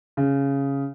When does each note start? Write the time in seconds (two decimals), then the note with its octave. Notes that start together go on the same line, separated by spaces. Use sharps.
0.17 C#3